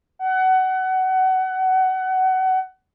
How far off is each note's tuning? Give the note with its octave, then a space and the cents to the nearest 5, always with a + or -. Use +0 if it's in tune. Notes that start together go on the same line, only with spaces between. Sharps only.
F#5 +25